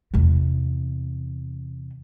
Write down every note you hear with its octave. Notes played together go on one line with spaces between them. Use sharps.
E2 C3